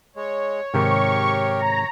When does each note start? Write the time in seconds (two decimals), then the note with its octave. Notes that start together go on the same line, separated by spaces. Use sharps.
0.16 G#3 C#5
0.74 G#2 C3 D#3 G4 A#4 C#6
1.59 A#5